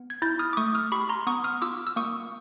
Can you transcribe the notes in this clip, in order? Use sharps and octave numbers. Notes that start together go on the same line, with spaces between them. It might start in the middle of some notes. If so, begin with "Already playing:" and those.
Already playing: B3
G#6
E4 G6 A6
D#6 F6
D6
A3 C#6 D#6
D#6 F6
G4 B5 C#6
A#5 C6
B3 C#6 D#6
D#6 F6
F4 D6 E6
E6
A#3 C#6 D#6